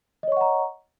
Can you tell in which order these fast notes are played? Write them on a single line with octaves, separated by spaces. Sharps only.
D#5 C#5 C#6 F#5 A#5